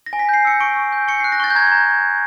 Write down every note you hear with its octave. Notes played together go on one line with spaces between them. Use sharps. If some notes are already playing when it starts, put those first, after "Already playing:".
A#6
G#5
B6
G6 C7
E6 C#7
C#6 D7
C#6
G6
C#6 C#7
F#6 C7
A#6
C#6 A6
G6
A#5 G#6
A#5 G#6